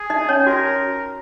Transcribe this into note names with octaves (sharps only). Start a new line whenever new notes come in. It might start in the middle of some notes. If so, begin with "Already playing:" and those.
Already playing: G#4
D#4 D#5
C#4 C#5
F#4 A#4